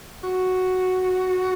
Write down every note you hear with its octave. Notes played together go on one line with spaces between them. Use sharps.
F#4